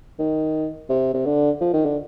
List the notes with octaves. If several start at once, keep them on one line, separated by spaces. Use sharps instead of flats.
D#3
C3
C3
D3
F3
D#3
D3